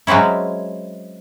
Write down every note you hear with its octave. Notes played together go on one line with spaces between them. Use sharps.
F#3 G#3 C4 C#4 E4